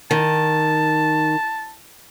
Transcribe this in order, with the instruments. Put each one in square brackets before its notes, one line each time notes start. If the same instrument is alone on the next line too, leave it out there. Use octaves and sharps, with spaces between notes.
[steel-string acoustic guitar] D#3 [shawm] A5